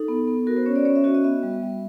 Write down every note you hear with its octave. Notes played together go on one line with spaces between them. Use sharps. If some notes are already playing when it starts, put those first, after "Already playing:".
Already playing: D#4 A4
B3
B3
F#4 A#4
C5
C#4 C#5
D5
C#4 C#5
E5
F#4 D#5
D#5
B3 E5
G3
G3